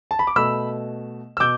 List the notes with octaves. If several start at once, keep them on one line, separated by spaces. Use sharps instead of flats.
A5
B5
D6
B2 A3 B5 E6
E6
B2 D6 G6